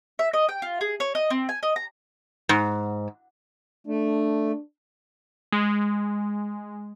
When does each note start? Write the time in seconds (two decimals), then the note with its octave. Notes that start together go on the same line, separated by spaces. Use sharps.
0.19 E5
0.33 D#5
0.49 G5
0.62 F4
0.81 G#4
1.00 C#5
1.15 D#5
1.30 C4
1.49 G#5
1.63 D#5
1.76 A#5
2.49 G#2
3.87 A3 D4
5.52 G#3